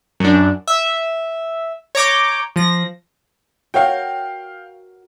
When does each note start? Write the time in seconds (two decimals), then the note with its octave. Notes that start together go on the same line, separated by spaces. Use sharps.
0.20 F#2 D4
0.68 E5
1.95 C#5 A#5 D6 G6
2.56 F3 A#6
3.74 F#4 A#4 C#5 F5 G5